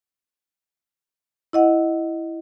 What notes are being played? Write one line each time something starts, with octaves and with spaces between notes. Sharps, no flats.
E4 D#5 F#5